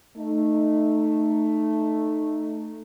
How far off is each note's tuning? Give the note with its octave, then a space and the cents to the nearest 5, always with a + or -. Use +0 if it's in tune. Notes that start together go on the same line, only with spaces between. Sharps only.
A3 +0 D#4 -15